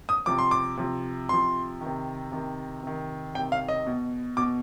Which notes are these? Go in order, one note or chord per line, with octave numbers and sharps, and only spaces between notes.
D#6
C3 F3 D6
C6
D6
C3 F3
C3 F3 C6
C3 D#3
C3 D#3
C3 D#3
C3 D#3 G5
F5
D#5
B2
B2 D6